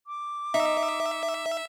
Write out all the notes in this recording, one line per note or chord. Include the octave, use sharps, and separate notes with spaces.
D6
D#4 E5